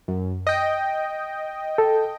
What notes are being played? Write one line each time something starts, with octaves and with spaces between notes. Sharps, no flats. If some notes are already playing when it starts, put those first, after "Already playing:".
F#2
D#5 G5
A4